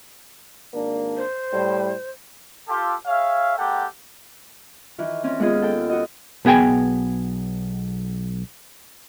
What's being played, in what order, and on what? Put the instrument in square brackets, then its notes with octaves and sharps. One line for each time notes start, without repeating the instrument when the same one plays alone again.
[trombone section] G#1 A#3 D4
[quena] C5
[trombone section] A2 G3
[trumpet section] F4 G4 A4
G#4 C#5 E5 F5
G#3 A#3 G4 A4 F#5 G5
[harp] D#3 E3
C4 C#4
D#2 G#3 B3 F4 G#4 D#5
A4 G5
F#4 D#5
[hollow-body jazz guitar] B1 B3 G#4 G5 G#5